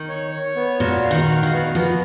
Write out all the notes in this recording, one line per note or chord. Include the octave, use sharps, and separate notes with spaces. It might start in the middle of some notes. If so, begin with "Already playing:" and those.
Already playing: D#3
C#5
C#5
B3
A#2 F#4
F5
D#3
F#4
D#3
B3
F3 B3